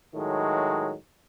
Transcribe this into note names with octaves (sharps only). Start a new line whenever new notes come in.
A2 D#3 F#3 G#3